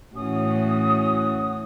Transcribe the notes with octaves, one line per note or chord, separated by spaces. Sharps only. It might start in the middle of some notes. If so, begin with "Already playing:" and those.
A2 E3 C#4 F#4 D#6